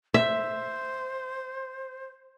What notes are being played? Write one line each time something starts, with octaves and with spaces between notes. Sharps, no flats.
C5 E5